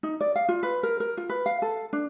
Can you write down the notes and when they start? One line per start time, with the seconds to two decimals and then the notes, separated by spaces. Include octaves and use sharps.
0.03 D#4
0.21 D5
0.36 F5
0.49 F4
0.63 B4
0.83 A#4
1.00 A#4
1.17 F4
1.29 B4
1.46 F5
1.62 A4
1.93 D4